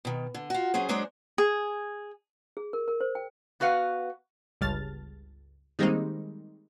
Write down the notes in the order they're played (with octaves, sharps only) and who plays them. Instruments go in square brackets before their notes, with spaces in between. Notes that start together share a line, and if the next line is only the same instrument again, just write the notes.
[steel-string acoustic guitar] B2 D#3
D3
F4 F#4
F#3 C#4 G#4 C5
F#3 G#3 D4 G#4 C5 C#5
[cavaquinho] G#4
[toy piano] G#4
A#4
A#4
C5
G5
[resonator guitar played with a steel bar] B3 F#4 B4 F5 F#5
[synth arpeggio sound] G1 C#2 G3 A5 F6 A6
D#3 G3 G#3 A#3 C4 D#4